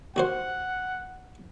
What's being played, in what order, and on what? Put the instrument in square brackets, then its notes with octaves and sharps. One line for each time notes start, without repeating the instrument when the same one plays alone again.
[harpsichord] D#2 F#4 C5 [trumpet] F#5